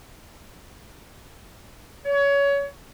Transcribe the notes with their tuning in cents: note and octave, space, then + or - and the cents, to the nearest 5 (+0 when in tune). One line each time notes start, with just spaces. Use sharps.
C#5 +25